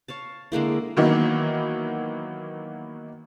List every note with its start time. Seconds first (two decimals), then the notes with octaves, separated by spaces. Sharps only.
0.08 C#5 F5 A5
0.52 D3 G#3 A#3 E4
0.97 D#3 E3 F#3 A#3 B3 D#4